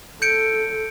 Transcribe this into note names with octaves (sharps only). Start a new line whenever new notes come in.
A4 G6 C#7 D7